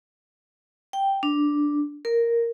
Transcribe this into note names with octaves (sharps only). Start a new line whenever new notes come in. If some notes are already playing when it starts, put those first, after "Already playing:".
G5
D4
A#4